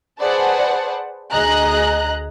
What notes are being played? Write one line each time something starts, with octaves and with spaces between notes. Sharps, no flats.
G#4 B4 C5 D5 F#5 A5
D2 G#4 D#5 A#5 F#6